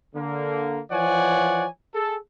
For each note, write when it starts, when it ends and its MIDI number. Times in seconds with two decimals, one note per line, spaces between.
0.15 0.80 50
0.15 0.80 58
0.91 1.66 52
0.91 1.66 53
0.91 1.66 73
0.91 1.66 74
0.91 1.66 78
0.91 1.66 80
1.95 2.16 68
1.95 2.16 69